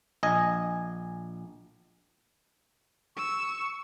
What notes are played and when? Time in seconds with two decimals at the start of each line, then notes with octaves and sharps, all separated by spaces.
0.23 A#1 D#5 G#5
3.16 C#6 E6